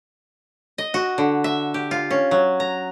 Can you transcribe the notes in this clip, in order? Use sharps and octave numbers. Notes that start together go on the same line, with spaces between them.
D#5
F#4
D3
E5
G4
F4
C#4
F#3
A#5